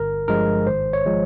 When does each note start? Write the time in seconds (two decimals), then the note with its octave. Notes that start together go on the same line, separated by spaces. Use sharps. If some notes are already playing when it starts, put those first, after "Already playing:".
Already playing: G1 A#4
0.28 G2 F3 G#3 A#4
0.67 G#1 C5
0.93 C#5
1.06 F3 G#3